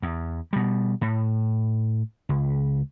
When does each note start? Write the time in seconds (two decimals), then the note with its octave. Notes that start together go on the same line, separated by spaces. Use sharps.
0.02 E2
0.53 B2 G3
1.01 A2
2.29 C#2